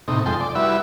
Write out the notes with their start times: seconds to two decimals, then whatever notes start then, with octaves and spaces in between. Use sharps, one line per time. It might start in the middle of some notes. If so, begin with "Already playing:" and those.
0.08 A2 C3 D#4
0.26 F2 G#3 A4 G5 C6
0.40 D5
0.55 G3 E4 F#4 B4 E5